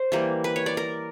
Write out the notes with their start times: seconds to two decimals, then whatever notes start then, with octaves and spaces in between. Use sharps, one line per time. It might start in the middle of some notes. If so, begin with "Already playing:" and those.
Already playing: C5
0.12 E3 G3 A#3
0.44 B4
0.56 C#5
0.66 D5
0.77 A#4